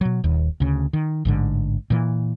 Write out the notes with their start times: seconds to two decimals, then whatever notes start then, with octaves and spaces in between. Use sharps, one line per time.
0.01 B2 F#3
0.24 D#1 D#2
0.60 D2 C#3
0.93 D#3
1.25 A1 G#2 D3
1.90 A#2 E3